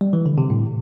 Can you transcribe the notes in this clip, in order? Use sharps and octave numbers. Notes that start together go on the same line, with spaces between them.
G3
E3
D3
C3
A2